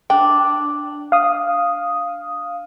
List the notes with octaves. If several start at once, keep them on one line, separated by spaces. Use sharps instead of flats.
D4 G5
F5 D#6